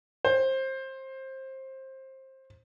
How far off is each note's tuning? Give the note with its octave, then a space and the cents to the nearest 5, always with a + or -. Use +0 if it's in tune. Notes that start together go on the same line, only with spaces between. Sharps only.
C5 +20